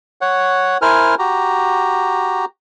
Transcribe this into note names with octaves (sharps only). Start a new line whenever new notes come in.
C#5 F#5
E4 A#4 C5 G#5 F6
F#4 G4 A#5